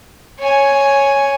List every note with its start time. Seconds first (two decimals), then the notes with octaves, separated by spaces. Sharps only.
0.40 C#5 G#5